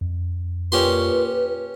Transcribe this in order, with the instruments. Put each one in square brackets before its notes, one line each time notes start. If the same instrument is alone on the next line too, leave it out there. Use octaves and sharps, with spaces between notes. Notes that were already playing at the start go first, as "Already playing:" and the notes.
[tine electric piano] F2
[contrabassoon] A#2 [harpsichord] C#4 G4 C6 [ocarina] B4